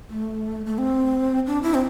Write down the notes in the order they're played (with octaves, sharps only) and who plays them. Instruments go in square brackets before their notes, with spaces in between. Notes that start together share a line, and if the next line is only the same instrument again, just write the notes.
[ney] A3
A3
C4
D4
E4
C4